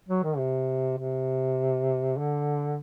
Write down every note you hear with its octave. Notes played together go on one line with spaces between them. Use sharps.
F#3
D#3
C3
C3
D3